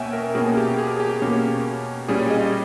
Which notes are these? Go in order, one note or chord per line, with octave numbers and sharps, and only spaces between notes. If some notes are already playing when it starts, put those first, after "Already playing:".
Already playing: B2 A#3 C#4 E5 G5 G#5
A#4
B2 A#3 C#4 G#4
G4
G#4
G4
B2 A#3 C#4
A#2 G3 C#4 G#4
D#5